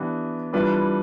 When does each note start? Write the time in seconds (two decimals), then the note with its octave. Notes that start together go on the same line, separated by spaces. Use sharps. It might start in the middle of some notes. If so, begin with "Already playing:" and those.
Already playing: E3 B3 D4 G4 B4
0.53 E3 G3 D4 F4 B4